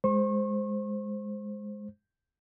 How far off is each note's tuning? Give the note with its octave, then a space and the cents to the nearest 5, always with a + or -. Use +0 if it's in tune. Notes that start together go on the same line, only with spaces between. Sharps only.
G#3 +0 C5 +0 C#6 -40